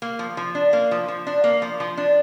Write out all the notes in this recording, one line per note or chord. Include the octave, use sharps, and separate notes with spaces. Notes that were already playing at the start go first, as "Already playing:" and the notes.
A#3
F3
F3
D4
A#3
F3
F3
D4
A#3
F3
F3
D4